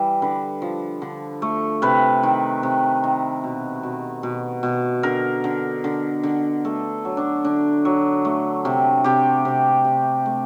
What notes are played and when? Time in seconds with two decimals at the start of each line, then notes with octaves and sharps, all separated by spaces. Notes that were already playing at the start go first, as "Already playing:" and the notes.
Already playing: E3 G3
0.22 D3 B4
0.62 F3
1.02 D3
1.42 A3
1.82 C3 B4
2.23 D#3
2.63 C3
3.04 D#3
3.44 B2
3.83 B2
4.23 B2
4.63 B2
5.03 D3 A#4
5.44 D3
5.84 D3
6.23 D3
6.65 A3 A4
7.05 F#3
7.17 D4
7.44 D3 D4
7.85 F#3
8.25 A3
8.65 C3
9.04 C3 G4
9.45 C3
9.85 C3
10.26 A3